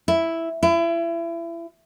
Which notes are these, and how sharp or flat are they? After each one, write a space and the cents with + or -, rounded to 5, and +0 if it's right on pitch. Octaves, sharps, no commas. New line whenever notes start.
E4 +0
E4 +30